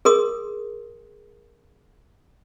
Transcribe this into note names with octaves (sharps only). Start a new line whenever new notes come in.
G#4 A#4 C6 D#6